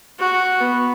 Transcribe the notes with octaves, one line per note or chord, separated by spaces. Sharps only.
F#4
B3